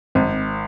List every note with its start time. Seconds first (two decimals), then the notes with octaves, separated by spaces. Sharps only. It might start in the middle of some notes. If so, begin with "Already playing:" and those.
0.15 G#1 C4